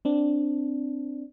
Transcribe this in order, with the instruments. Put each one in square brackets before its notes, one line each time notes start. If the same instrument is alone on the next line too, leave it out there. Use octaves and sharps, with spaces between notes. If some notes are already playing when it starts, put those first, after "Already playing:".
[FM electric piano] C4 D4